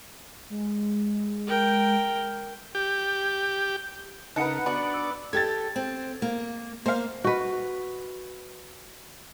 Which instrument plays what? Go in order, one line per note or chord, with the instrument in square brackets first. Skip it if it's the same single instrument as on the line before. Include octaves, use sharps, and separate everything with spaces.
[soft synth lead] G#3
[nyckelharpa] A#4 G5
[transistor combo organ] G4
[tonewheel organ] C#3 A#4 [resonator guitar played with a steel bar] D#4 [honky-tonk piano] B4 F#5 A5 [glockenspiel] F#6 C#7
[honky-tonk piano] B3 [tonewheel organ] D4 D5 [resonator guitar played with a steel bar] F#4 [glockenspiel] B5
[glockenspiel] E6
[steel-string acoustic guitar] G4 A4 [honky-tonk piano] G#6 A6
[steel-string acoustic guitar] C4
A#3
[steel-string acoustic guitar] A#3 [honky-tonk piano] C5 F5
[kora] F#4 B4